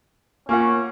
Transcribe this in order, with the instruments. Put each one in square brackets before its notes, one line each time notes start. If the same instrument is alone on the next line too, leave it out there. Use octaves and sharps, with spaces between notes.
[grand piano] A#3 F4 F#5 [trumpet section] C#4